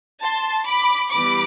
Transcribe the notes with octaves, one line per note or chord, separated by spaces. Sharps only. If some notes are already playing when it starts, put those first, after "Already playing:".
A5 C6
B5 D6
E3 G3 B3 B5 D6